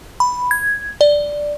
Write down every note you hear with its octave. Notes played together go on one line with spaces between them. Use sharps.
B5
G#6
D5